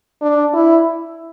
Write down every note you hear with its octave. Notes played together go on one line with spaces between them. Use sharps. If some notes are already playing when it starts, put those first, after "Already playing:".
D4
E4